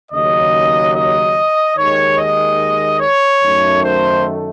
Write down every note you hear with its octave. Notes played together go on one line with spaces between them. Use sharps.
D#2 C#3 F#3 D#5
D#5
D#2 D#3 G#3 C#5
D#5
C#5
F#2 D#3 A3
C5